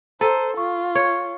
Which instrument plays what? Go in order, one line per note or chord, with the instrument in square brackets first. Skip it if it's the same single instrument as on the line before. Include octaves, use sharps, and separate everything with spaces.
[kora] A4 [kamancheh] C5 [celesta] A5 A#5 D#7
[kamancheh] F4 [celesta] C#6
[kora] C#5